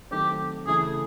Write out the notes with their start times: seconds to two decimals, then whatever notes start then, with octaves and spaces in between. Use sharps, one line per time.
0.11 D#3 F#3 A3 C4 G4
0.67 C#3 E3 A3 G#4